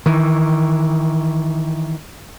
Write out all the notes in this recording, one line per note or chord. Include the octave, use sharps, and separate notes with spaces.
D#3 E3